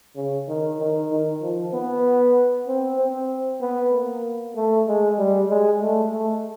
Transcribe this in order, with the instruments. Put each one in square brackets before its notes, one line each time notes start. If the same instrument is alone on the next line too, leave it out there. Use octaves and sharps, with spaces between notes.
[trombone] C#3
D#3
D#3
D#3
F3
B3
C4
C4
B3
A#3
A3
G#3
G3
G#3
A3
A3